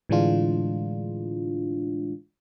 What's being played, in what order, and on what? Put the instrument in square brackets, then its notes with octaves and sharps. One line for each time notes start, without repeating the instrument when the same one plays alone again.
[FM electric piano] A2 D3 E3 G#3 D4 F4